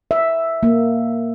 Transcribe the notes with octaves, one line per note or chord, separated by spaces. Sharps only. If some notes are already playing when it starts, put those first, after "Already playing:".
E5
A#3